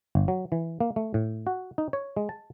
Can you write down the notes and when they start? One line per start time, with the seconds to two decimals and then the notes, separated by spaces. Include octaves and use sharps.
0.15 G1
0.28 F#3
0.52 E3
0.80 A#3
0.96 A3
1.14 A2
1.47 F#4
1.78 D#4
1.93 C#5
2.16 G#3
2.29 A5